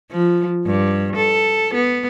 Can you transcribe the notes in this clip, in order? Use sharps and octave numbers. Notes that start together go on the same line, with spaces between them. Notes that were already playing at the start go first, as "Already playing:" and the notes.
F3
G2
A4
B3